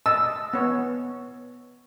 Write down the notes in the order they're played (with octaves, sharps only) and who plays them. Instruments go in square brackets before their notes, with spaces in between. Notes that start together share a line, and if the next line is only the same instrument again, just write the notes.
[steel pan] D#5 A5 [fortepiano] E6
[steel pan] B3 C#5